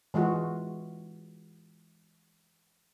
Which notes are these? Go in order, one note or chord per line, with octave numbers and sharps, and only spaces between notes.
E3 G#3 F4 F#4